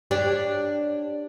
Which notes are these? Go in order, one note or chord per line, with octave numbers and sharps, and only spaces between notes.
D4 G4 C#5